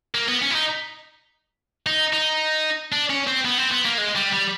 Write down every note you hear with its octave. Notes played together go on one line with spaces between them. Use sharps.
A#3
B3
C#4
E4
D#4
D#4
D#4
D4
C#4
C4
B3
C4
B3
A#3
G#3
G3
G3